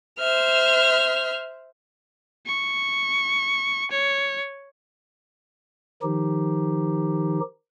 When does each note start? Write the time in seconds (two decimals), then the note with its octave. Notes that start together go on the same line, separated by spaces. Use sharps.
0.19 C5 E5 F6
2.47 C#6
3.91 C#5
6.03 D#3 F3 D#4 G4